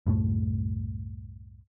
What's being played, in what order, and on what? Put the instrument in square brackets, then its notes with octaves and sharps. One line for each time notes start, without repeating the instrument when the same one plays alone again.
[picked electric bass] C2 F#2 A2 A3